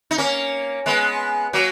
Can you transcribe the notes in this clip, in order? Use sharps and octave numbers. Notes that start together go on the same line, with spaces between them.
D#4
A#3 C#4
G#3 B3
F#3 A#3